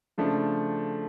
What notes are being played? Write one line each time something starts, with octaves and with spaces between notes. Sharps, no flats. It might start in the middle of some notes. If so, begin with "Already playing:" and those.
C#3 F3 A3 D4